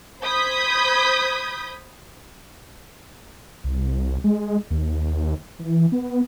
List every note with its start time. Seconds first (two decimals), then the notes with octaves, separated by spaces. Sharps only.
0.22 C5 B5 D#6 G6 G#6 B6
3.64 C2
4.24 G#3
4.71 D#2
5.59 E3
5.92 B3